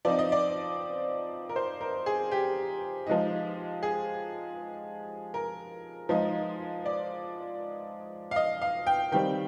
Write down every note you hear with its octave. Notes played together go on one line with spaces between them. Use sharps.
F3 C4 D#4 D5
D#5
D5
A#4
C5
A#4
G#4
G4
F3 G#3 D#4
G#4
A#4
F3 G#3 D#4
D5
F5
D#5
F5
G5
D#3 G3 C4 G5